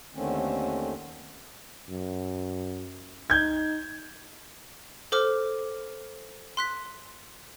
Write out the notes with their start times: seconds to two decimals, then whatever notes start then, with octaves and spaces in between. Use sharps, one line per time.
0.15 D#2 D3 D#3 A3 C4 C#4
1.89 F#2
3.30 D#4 G6 G#6
5.12 A4 C5 D6 F6
6.57 C6 F#6 B6